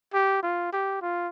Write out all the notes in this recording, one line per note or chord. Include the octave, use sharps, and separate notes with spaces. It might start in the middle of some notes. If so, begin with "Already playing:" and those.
G4
F4
G4
F4